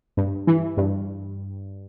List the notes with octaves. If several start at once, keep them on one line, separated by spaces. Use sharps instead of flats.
G2
E3
G2